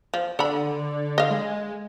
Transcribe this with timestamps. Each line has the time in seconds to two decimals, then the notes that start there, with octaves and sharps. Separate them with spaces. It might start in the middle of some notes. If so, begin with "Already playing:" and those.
0.14 F3
0.39 D3 A4 B5
1.18 D#5 F5
1.30 G#3